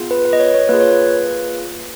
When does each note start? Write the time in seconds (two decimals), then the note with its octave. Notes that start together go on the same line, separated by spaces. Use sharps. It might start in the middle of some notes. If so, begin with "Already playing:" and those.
Already playing: B3 F4 G#4
0.11 B4
0.25 B4
0.33 D#5
0.40 C#5
0.54 C#5
0.69 A#3 F4 G#4 B4
0.80 C#5
0.91 B4